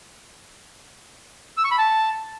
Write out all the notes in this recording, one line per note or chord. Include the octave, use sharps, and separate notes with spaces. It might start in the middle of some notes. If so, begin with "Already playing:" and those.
E6
C#6
B5
A5